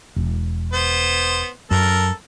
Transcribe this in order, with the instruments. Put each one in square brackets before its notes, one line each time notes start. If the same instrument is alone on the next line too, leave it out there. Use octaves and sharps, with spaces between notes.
[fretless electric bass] E1
[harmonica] B3 C5
[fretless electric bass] F#2 [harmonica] A4 A#4